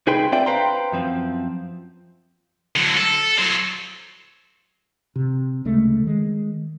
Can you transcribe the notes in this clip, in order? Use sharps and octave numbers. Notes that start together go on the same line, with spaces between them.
C2 D#4 G#4 B4 G5 C6
C4 D4 F4 D5 E5 G5
B4 C5 F5 G5 A#5 C6
F#2 F3 C4
D3 F#3
A4
F#3 C5
C3
D2 C#3 G#3 A3
D#3 G#3